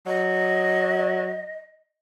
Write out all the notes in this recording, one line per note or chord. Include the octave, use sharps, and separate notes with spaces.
F#3 D#5